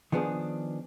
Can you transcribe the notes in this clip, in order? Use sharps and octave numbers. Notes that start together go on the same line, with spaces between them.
D#3 F3 B3 D4 G#4